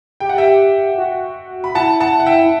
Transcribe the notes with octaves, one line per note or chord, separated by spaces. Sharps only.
G4 G5
F#5
E5 G5
F#4
B5
E4 F#5 A5
F#5 A5
F#5
E5 G5